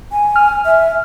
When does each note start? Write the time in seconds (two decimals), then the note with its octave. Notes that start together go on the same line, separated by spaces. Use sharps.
0.12 G#5
0.36 F6
0.65 E5